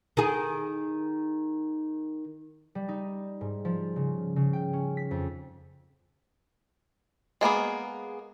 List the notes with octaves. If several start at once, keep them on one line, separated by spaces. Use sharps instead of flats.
D#3 G#4
G3
D#4
G#2
F3
C#3
C#3
G5
C#4
B6
F2
G#3 A#3 B3 G#4